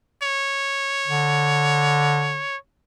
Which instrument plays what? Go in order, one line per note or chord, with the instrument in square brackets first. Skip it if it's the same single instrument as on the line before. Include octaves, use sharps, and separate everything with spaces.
[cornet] C#5
[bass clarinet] D3